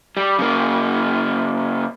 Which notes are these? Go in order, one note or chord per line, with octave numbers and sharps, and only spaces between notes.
G3
C#3 A#3